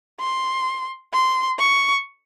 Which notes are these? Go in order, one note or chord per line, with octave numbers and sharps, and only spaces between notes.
C6
C6
C#6